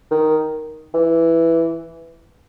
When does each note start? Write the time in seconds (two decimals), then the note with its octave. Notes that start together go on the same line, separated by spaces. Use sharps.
0.11 D#3
0.94 E3